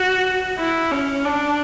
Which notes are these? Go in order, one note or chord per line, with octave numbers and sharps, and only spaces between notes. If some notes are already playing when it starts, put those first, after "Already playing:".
Already playing: F#4
E4
C#4
D4